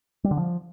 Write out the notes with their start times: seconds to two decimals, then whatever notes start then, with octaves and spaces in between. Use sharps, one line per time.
0.24 G3
0.31 D3
0.37 F3